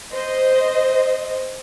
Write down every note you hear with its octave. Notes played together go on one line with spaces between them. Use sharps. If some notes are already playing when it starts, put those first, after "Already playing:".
C5 D#5